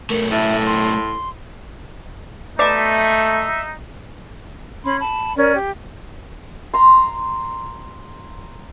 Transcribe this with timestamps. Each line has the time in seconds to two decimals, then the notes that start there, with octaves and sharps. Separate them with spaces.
0.10 B1 A3 A#4
0.32 A2 E5
0.66 C6
2.59 B2 A3 D#4 D5 E5
4.84 C#4 B5 C6
5.00 A5 B5
5.37 C#4 A#4 D5
5.56 G4
6.74 A#5 C6